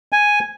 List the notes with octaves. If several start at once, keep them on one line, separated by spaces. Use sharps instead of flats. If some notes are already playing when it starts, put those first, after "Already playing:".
G#5